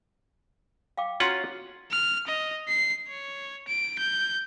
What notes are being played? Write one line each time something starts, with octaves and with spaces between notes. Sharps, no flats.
F5 G5 D6
C#4 F4 F#4 F#5 A#5 C6
F6
D#5
C7
C#5
D7
G6